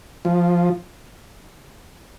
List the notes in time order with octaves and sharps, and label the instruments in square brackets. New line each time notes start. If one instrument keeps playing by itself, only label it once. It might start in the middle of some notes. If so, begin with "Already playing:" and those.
[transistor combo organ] F3